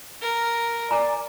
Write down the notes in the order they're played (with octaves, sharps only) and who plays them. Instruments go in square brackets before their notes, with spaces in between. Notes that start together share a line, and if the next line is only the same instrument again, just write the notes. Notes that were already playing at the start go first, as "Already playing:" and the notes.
[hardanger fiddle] A#4
[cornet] D5 [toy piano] G#5 A#5